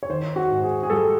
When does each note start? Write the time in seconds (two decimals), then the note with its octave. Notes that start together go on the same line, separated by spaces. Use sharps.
0.03 C#5
0.10 D#3 C5
0.36 F#4
0.50 G#2
0.63 G#4
0.83 G#4
0.90 G3 A4